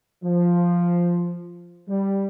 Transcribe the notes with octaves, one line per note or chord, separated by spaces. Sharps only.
F3
G3